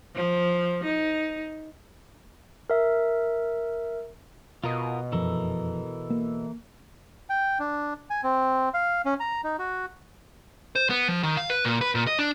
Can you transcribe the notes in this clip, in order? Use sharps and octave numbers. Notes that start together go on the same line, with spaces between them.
F3
D#4
A#4 E5
B2 F4 A#4 D#5
F1 F#2 E3 F3 A4 A#4
A#3
G5
D4
G#5
C4
F5
C#4
A#5
D#4
F#4
C5
B3
F3
D#3
F5
B4
A#2
B4
A#2
D#5
D4